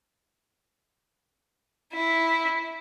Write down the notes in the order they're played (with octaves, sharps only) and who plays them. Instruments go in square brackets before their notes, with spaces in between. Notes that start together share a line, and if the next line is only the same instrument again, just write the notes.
[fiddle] E4